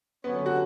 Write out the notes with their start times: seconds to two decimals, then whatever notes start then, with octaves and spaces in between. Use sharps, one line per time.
0.24 D3 F#3 B3 C#4
0.46 F#4